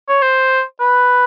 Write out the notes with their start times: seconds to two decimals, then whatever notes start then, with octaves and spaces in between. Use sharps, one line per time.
0.09 C#5
0.22 C5
0.81 B4